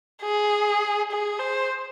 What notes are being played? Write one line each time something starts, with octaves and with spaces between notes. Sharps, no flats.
G#4
G#4
C5